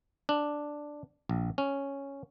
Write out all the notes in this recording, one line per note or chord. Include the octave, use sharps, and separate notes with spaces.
D4
A#1
C#4